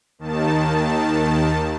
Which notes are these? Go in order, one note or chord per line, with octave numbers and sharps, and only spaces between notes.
D#2 D#3 A5